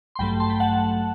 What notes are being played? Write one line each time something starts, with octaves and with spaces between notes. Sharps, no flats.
C6
A1 G2 F#3 A3 G5 B5
A5 C6
G5 B5
F#5 A5